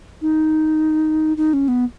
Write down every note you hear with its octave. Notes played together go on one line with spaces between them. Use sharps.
D#4
D#4
C#4
B3